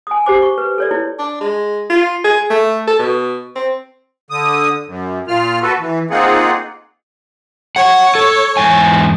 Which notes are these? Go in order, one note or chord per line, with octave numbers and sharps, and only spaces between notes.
G#5 D#6
G4 C5 D6
C#6
B4
A4 C#5 D5
E4
D4
G#3
F4
G#4
A3
A4
B2
C4
D3 D#6
F#2
A#2 F4 F6
F#4 A4 B4
E3
A#3 C4 D#4 F4 G#4 F#5
C#5 F#5
A4
E2 G#2 G#5